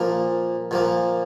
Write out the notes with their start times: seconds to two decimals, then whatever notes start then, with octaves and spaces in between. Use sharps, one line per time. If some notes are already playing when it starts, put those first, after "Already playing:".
Already playing: A#2 F3 A#3
0.71 A#2 F3 A#3